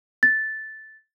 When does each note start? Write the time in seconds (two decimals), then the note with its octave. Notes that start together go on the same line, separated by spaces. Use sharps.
0.23 A6